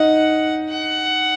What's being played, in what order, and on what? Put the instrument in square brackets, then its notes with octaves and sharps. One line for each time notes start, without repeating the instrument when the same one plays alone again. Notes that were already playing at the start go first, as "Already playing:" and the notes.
Already playing: [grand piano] D#4 [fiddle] F#5
[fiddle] F#5